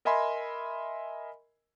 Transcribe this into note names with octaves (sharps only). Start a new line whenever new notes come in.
A#4 D#5 E5 G#5 B5 C6